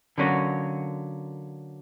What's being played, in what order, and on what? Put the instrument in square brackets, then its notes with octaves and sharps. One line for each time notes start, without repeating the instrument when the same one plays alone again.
[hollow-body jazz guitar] D3 F#3 A#3 C#4 F#4